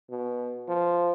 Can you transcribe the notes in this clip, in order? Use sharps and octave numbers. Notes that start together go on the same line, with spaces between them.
B2
F3